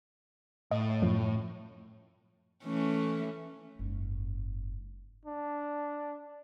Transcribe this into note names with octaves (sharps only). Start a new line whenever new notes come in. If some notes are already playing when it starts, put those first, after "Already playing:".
A2 D#5
F#2 F3
E3 A3 C#4
F#1 G#2
D4